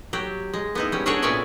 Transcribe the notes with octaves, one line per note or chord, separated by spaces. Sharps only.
F#3 G4
G#3
B3 D#4 E4
G3 C#4
C#4 D4 F#4 G#4 A4 C#5
A#2 B3 C#4 C#5 D5 E5